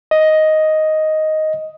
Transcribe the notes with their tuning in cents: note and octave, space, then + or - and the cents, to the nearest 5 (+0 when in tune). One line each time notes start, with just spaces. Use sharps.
D#5 +5